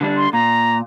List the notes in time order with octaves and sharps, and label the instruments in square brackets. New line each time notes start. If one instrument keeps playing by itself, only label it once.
[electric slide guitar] D3 G3 D4
[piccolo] C6
[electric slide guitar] A#2 [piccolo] A#5